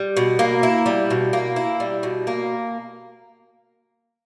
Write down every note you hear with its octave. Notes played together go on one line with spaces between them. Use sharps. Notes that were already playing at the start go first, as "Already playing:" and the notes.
Already playing: G3
B2
A#3
E4
G3
B2
A#3
E4
G3
B2
A#3